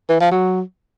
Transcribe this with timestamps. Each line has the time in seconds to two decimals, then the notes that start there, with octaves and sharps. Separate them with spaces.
0.10 E3
0.21 F3
0.32 F#3